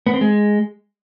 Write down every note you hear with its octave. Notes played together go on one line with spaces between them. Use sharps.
B3
C4
G#3